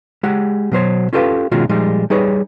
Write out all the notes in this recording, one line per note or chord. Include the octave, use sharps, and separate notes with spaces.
G#3 G4 F#5
B2 F#3 C5 C#5
C#4 F4 G4 A4 B4 F5
B2 D#3 G#3 C#4 F4 F#4
A#2 F3 G3 G#3 D#4
G3 D#4 G#4 B4 C#5